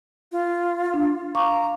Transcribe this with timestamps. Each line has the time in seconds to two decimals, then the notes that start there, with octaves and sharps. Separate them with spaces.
0.32 F4
0.94 D4
1.35 F5 A#5 C#6 D6